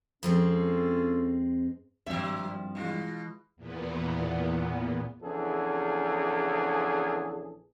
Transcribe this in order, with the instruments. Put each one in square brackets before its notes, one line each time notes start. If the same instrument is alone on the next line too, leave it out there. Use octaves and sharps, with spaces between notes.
[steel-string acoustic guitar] F2 G#3 C4 [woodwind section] C#4 F4 A4
[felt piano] G#1 F5 [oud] G2 F3 [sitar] F#3 E5
[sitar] B2 F4 [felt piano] E3 G#3
[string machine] E2 A#2 B3
[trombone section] A#1 E2 C#3 G#4 A4